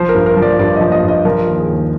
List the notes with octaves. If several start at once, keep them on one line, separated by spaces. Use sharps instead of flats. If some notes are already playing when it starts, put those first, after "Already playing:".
Already playing: F3 C5
A#4
G2
A#4
F3
D5
G2 D5
D#5
F3
D#5
G2
D#5
F3 A#4
D#2
G#4
D#2